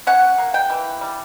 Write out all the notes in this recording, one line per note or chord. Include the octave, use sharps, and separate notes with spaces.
C#4 F#5
A#3
G5
E3
G3